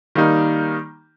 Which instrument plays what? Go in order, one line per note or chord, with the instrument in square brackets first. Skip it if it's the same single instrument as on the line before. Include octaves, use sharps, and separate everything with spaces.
[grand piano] D#3 G3 A#3 D#4